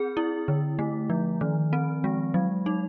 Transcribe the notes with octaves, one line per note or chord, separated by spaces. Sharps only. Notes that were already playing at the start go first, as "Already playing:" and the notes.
Already playing: C4 G#4
E4
D3
A3
F3
D#3
C4
G#3
F#3
D#4